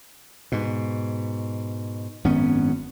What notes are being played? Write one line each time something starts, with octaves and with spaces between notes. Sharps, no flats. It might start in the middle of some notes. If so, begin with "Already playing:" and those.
G#2 B2
G#1 F#2 B3 C#4